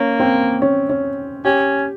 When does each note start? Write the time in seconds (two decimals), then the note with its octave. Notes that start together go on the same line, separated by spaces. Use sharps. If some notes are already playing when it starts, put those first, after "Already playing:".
Already playing: A#3 C#4
0.20 C4
0.62 C#4
0.89 C#4
1.45 C#4 G4